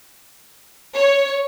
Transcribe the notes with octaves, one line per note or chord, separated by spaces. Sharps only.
C#5